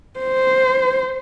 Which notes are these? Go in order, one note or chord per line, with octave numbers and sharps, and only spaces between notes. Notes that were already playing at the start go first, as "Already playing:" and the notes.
C5